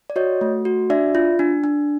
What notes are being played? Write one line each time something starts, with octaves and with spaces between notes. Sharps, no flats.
D5
F#4 C#5 D#5
A3
F#4
D4 D5 E5
F4
D4
D4